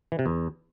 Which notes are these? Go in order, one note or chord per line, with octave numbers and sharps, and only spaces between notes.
E3
C3
E2